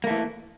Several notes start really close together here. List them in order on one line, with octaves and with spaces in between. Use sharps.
A#3 A3 E3